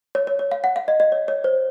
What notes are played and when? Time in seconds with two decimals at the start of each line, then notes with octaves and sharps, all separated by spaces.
0.15 C#5
0.27 C#5
0.39 C#5
0.52 F5
0.64 F#5
0.76 F5
0.88 D#5
1.00 D#5
1.12 C#5
1.28 C#5
1.44 C5